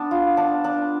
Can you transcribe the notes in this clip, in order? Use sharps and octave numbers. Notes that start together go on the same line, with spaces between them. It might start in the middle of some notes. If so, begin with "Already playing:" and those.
Already playing: B3 D4
F4
D4
D4